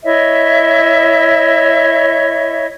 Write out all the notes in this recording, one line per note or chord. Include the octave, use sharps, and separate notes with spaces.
E4 C#5 D#5 E5